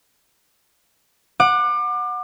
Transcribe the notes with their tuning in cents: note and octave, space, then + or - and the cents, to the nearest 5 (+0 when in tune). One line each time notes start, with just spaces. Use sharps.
F#5 -15 D6 +30